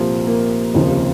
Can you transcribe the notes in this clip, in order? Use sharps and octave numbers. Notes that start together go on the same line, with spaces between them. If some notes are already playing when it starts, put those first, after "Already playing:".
Already playing: C2 A#2 F3
A#3
F1 D#2 C#3 F3